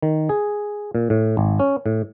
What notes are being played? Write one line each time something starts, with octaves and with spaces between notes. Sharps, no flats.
D#3
G#4
A#2
A2
G#1
C#4
A2